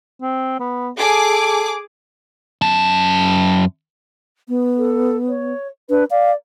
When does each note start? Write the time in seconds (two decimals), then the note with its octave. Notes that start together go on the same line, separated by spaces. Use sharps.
0.21 C4
0.59 B3
0.99 G#4 A4 D6
2.62 F#2 A5
4.49 B3
4.78 A4
5.29 C#5
5.90 D4 B4
6.11 D5 F5